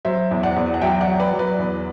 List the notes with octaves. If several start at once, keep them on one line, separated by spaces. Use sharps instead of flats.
F#3 C5 E5
E2
D5 F#5
E2
F#5
F#3 E5 G5
D5 F#5
F#3
B4 D5
F#3
B4 D5
E2